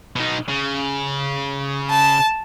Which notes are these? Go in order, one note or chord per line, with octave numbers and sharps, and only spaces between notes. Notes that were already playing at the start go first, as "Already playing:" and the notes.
B2 D#4
C#3
A5